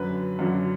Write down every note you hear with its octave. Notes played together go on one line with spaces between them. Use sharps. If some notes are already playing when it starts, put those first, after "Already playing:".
Already playing: F#2 D3 F#3 B4
F#2 D3 F#3